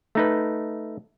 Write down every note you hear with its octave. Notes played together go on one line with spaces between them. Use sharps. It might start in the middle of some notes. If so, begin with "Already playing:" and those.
A3 D#4 B4